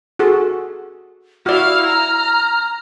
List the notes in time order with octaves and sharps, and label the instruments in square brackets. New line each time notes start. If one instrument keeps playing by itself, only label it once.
[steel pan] F#4 G#4 A4
[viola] E4 F5 [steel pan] F#4 D5 [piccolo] F6
[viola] A#5